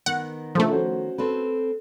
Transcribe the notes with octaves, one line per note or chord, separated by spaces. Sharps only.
D#3 B3 F#5
C#3 F3 A3 D4 A4
C#4 F#4 C5
C4 A4 B4